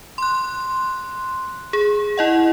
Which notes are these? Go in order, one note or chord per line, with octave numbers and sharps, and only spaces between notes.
C6 F#6
G#4
E4 D#5 F#5